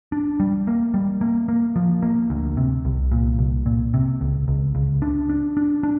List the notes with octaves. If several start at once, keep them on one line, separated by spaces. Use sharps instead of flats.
D4
G3
A#3
G3
A#3
A#3
F3
A#3
D2
C3
C2
A#2
C2
A#2
C3
C#2
C#2
C#2
D4
D4
D4
D4